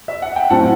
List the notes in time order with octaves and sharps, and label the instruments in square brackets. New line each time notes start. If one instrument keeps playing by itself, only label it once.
[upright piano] E5
F#5
G5
A2 F#3 C4 F#5 A5